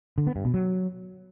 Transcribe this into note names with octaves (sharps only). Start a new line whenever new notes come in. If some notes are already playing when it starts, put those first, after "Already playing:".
D3
B3
G2
B2
F#3